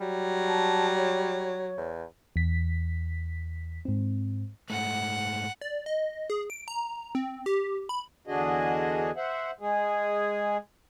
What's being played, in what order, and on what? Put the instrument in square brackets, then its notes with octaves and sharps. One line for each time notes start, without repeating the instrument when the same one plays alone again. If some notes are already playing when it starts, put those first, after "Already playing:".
[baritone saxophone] F#3 [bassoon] G3
[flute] A5
C#5
[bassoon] E2
[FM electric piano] E2 B6
G#2 C4
[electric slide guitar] G#2 A3 [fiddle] F#5
[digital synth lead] D5
D#5
G#4
D7
A#5
C4
G4
B5
[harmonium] E2 D3 D4 F#4 G#4 D#5
C5 E5 F#5
G#3 G#4